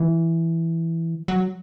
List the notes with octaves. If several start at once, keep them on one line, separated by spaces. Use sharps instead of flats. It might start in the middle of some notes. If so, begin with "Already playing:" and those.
Already playing: E3
F#3